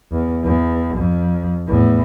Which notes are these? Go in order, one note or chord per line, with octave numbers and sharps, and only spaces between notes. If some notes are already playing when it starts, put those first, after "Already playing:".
E2
E2
F2
E2 A2